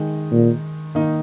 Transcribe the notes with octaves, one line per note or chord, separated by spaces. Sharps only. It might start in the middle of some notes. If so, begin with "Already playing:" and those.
Already playing: D#3 G#3 D#4
A#2
D#3 A#3 D#4